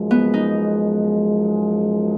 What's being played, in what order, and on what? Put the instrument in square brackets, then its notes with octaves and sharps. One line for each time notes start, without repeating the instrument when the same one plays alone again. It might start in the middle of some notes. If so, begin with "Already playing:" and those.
Already playing: [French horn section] F#2 F3 G#3
[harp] B3
D#4